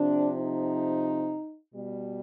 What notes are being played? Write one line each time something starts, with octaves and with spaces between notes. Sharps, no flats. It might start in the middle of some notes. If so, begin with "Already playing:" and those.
Already playing: C3 F3 D4
D#4
B2 G3